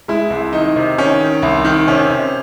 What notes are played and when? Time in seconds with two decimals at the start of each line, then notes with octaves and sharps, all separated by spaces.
0.08 G#3 E4
0.30 C2
0.53 D#3 D#4
0.76 C3
0.98 D#3 C#4
1.20 D#3
1.42 C2
1.65 D#3
1.88 C3 C#4
2.10 C3